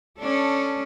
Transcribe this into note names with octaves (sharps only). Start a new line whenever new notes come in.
C#4 D4 A4